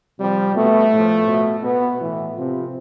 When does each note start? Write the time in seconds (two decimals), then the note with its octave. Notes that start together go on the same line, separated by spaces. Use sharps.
0.19 C3 F3 G3
0.55 B2 A3
0.92 A2 F3
1.27 B2
1.63 B2 B3
1.99 A2 E3
2.36 C3 F3